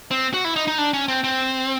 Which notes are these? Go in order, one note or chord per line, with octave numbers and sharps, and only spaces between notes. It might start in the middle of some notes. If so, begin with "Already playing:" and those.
C4
F#4
E4
D#4
D#4
D4
C#4
C4
C4